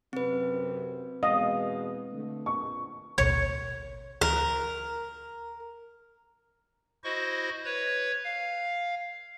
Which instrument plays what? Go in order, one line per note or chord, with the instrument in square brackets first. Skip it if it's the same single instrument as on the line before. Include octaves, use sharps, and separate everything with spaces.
[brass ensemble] F#2 C3 [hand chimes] C4 B4
[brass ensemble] E2 B2 G#3 [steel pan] D#5 [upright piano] F5
[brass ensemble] D3 A3
[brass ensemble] A#1 [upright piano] C#6
[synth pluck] A1 D2 B2 [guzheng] C#5
[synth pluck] D2 E3 F#6 [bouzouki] A#4
[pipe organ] E4 F#4 C5 D#5 C#6
B4 C#5 G#6
F5